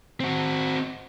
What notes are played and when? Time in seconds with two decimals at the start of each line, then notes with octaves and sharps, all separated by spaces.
0.20 C4 F#4